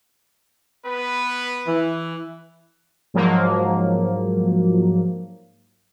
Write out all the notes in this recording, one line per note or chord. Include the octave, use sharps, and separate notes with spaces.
B3 B4
E3
G#2 F3 F#3 A#3